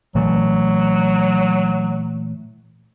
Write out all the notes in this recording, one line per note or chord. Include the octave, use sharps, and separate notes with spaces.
A#2 E3 F#3 A3